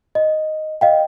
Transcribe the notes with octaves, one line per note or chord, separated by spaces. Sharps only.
D#5
D#5 F5 G5